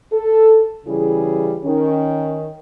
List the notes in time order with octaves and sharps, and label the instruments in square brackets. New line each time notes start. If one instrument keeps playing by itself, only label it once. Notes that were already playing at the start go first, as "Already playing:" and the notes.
[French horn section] A4
C#3 E3 G3 E4 G#4
D#3 C#4